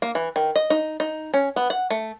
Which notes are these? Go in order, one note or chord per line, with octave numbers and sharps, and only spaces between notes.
A#3
E3
D#3
D#5
D#4
D#4
C#4
B3
F#5
A3